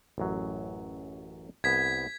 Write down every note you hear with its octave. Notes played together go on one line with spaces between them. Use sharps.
A1 F#2 F#3
C2 B3 G#6 B6